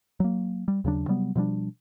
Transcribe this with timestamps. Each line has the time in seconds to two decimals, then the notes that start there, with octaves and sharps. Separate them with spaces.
0.20 F#3 A#3
0.68 G3
0.84 D#2 C#3 F#3 D4
1.08 C3 F#3 G3 B3
1.35 B2 F3 G3 D4